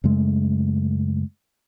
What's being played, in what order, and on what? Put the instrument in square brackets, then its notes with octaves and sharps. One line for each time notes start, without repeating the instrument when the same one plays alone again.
[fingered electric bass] F#2 C#3 G#3 A3